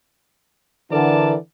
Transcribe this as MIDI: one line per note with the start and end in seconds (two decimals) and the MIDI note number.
0.92 1.33 50
0.92 1.37 52
0.92 1.33 70
0.92 1.33 74
0.92 1.33 81